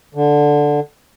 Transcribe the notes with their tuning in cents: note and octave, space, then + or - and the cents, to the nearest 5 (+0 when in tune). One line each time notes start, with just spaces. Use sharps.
D3 +0